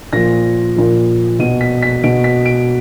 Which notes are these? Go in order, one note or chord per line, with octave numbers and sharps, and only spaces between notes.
A#2 F3 A#6
A#2 F3
B2 D#7
B6
B6
B2 D7
B6
D7